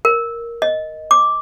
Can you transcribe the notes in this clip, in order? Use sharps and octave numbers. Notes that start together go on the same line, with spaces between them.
A#4
D#5
D6